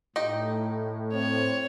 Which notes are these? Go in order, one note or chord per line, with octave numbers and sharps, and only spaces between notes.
A2 D#4 G4
C4 C#5